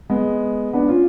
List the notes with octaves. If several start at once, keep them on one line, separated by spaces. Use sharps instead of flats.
G#3 B3
B3 D4
C#4 F4